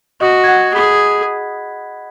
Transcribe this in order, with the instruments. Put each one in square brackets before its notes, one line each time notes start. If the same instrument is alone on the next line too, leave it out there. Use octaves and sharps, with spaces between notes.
[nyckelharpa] F#4 [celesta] D#5 D#6
[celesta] G#6
F#5 F#6
[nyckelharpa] G#4 [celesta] B5 B6